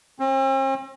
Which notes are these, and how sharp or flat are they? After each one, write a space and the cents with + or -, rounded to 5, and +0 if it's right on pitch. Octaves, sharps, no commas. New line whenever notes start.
C4 +45